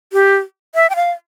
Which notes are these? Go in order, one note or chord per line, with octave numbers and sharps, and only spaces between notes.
G4
E5
G5
F5